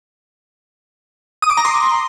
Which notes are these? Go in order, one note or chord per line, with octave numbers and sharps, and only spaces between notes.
D#6
D6
A#5
C6